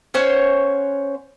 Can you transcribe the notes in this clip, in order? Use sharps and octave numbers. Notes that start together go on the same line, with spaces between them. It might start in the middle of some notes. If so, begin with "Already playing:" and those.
C#4 C5 C#5 F#5